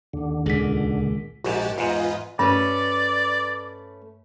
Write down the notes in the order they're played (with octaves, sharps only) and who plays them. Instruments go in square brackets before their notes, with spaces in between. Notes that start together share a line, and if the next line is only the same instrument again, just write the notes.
[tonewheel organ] D#2 D3
[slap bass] C#2 A#2 D#3 [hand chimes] G#4 B6
[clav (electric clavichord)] A#1 G#2 [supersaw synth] F#4 G4 A5
[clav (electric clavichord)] E2 G#2 [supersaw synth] F4 B4 D#5
[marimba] G2 [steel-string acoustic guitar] A3 C#4 B4 [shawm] D5